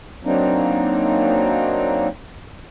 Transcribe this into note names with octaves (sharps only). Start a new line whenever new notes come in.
F#3 A#3 C4 D4 D#4